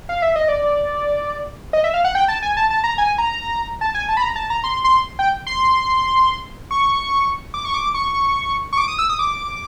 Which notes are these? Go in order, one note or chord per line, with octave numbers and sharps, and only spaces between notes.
F5
E5
D#5
D5
D#5
E5
F5
F#5
G5
A5
G#5
A5
A5
A#5
G#5
A#5
A5
G#5
A5
B5
A#5
A5
A#5
C6
C6
G5
C6
C#6
D6
C#6
D6
C#6
C#6
D6
D#6
E6
D#6
D6